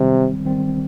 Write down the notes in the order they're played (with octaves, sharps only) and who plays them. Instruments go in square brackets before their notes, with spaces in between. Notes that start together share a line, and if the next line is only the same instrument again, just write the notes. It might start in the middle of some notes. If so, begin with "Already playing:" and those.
Already playing: [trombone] C3 [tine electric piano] D#3 G3 C4
[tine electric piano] D#3 G3 C4